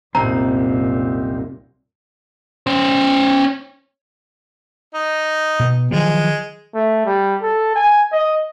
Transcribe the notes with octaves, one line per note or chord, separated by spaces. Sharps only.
C2 F#2 A#2 C4 D#4 A#5
C#4 C5
D#4
B2
D#3 F3 F#3 G#3
A3
G3
A4
G#5
D#5